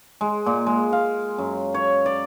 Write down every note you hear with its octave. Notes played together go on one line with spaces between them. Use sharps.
G#3
A#2
G#3
F5
F#2
C#5
D5